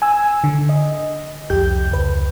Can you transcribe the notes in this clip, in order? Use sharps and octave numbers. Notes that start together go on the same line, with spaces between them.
G#5 E6
D3
D#5
C2 F2 G4 G6
C#2 B4